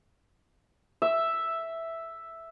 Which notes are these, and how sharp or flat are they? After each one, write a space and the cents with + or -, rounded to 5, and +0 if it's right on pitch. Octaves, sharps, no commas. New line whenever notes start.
E5 +0